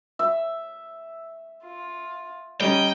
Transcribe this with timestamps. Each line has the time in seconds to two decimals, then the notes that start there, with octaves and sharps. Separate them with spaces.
0.19 E5
1.64 F4
2.61 G3 C#4 D#5 G5 A#5